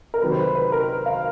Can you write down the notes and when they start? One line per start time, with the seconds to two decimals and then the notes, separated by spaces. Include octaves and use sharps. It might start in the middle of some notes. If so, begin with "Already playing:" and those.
0.14 A#4
0.21 C3 D#3 F#3 B4
0.32 C5
0.38 B4
0.55 B4
0.72 A#4
0.89 B4
1.06 F5